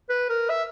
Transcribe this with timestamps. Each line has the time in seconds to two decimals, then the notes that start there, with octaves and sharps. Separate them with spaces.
0.09 B4
0.29 A#4
0.50 E5